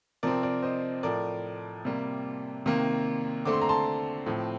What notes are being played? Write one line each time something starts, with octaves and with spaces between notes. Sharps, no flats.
C3 F3 C4 A#4 D5
A#4 D5
C5 D#5
A2 F3 A3 A#4 D5
C3 G3 A#3
C3 D#3 A#3
D3 A3 C4 D6
C6
A#5
A5 C6
A2 F3 C4